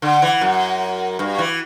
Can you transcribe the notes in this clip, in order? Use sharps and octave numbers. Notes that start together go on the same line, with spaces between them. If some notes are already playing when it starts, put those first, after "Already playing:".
D3
E3
F#2
G2
E3